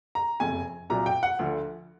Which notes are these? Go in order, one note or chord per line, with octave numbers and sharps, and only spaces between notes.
A#5
F#1 F2 C3 G#5
C2 A#2 F#3 A#5
G5
F#5
D2 D3 F3